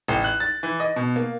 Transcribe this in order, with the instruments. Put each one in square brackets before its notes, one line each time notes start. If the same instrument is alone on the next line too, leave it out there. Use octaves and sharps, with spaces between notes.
[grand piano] A1
F#6
A6
E3
D#5
B2
A#3